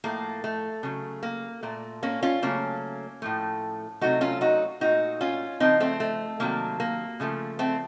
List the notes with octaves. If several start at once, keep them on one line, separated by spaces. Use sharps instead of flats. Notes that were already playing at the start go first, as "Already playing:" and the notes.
A2 F3 A3 A#3
A3
C#3 F#3 A3
A#3
A#2 A3
A#3 C#4
C#4 F4
C#3 F#3 A3 A#3 C#4
A2 F3 A3
C3 F#3 A3 D#4 F#4
C#4 F4
D#4 F#4
A#2 A3 D#4 F#4
C#4 F4
C#3 F3 A3 C4 D#4
A3 C4
A3
C3 D#3 F#3 A3 A#3
A#3
C#3 F3 A3
A3 C4